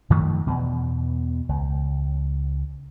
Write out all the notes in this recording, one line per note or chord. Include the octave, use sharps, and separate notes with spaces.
F#2 D#3 F3 A3
E2 B2
C#2